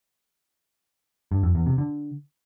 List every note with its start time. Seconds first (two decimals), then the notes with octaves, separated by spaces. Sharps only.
1.32 G2
1.43 F2
1.55 E2
1.66 C3
1.78 D3